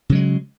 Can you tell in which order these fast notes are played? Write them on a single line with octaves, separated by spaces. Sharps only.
C#3 F#3 G#3